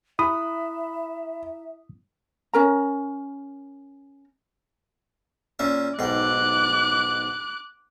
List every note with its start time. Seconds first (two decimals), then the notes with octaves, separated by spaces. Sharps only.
0.19 E4 E5 B5 D#6
2.54 C#4 A#4 A#5
5.59 A#2 C#4 E5
5.99 B1 G#2 G5 D6 F#6